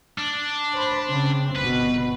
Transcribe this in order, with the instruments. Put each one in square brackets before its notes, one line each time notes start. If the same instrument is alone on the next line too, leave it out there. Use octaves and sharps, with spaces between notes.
[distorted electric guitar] D4
[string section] C5 B5
C#3 C4
[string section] G1 B2 [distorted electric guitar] B4